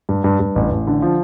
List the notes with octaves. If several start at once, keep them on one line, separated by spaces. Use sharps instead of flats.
G2
G2
G2
A1
A1
D3
F3